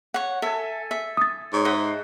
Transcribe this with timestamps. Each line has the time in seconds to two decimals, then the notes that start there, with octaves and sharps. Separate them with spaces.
0.14 C#5 F#5
0.42 A4 E5 G#5
0.91 E5
1.17 D#6 A6
1.53 G#2 C#5
1.65 C5 D#5 E5 F#5